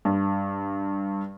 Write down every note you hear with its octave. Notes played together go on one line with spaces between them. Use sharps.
G2